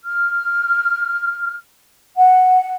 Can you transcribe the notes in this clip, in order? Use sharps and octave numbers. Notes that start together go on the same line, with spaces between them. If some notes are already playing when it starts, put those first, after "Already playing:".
F6
F#5